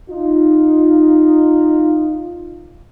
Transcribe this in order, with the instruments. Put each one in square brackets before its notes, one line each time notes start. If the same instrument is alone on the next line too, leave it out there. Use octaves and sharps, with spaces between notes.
[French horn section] D#4 F4